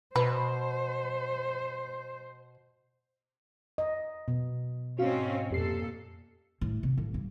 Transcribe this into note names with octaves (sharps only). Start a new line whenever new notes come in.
B2 B4 C5
D#5
B2
G#2 C4 C#4 F#4 F5
F2 A#2 G4 A4 C7
A2
C3
A1
G2